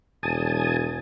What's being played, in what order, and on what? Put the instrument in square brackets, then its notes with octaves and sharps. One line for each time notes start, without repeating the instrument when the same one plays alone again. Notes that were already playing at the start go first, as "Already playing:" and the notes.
[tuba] E1 [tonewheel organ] G#5 A5 D#6